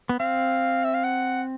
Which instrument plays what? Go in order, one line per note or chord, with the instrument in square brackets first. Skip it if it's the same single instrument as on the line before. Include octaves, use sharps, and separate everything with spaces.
[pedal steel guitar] B3
[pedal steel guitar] C4 [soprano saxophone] F5
[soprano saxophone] E5
F5
F#5